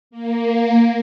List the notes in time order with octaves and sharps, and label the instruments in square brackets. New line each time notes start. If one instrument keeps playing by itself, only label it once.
[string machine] A#3